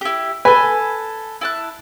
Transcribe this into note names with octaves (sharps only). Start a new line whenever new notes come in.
E4 G4
A4 B4 G#5
E4 A5 F#6